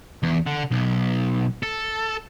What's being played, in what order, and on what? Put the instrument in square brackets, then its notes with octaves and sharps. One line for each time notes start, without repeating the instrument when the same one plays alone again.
[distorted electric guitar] E2
D3
B1
A4